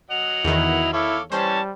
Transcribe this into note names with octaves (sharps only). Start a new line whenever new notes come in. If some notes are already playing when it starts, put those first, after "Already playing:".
F#3 D#5 F#5 F7
E2 D#3 E4
E4 A4 C#5 F5 D6
E3 G3 C#4 C5 C#5 A5